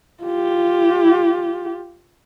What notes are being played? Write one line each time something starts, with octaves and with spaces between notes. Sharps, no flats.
F4 G4